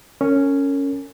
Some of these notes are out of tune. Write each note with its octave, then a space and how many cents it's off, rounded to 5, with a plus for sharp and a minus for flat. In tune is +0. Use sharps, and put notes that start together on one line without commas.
C#4 +0 A#4 -35